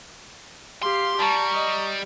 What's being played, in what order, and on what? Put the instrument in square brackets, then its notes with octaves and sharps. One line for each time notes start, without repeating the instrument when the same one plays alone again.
[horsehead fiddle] G4 F5 [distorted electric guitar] C6
[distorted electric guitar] G3 [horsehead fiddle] A5 [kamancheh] A#5 C#6
[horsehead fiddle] D#5